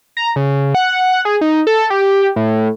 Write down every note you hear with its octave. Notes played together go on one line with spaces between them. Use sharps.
A#5
C#3
F#5
G#4
D#4
A4
G4
A2